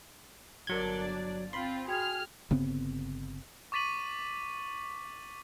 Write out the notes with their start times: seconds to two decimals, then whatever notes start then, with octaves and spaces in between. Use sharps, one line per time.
0.67 G1 F#3 D4 A#4 D5 G#6 C#7 G7
1.02 A6
1.53 C4 F4 B5 C6
1.88 F#4 G#4 G5 F6 G#6
2.51 G1 C#3 B3 C4
3.72 C#6 D6 A6 B6 D#7 F#7